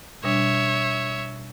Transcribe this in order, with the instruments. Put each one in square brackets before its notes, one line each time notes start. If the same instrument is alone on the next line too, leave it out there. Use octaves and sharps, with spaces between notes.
[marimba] B2 G3 D4 [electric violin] C#5 E5